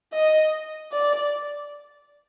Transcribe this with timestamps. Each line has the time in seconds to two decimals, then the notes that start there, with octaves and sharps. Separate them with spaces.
0.13 D#5
0.92 D5